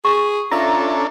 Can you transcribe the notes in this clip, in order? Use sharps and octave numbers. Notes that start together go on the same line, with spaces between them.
G#4 C#6
C#4 D4 F4 A4 E5 A#5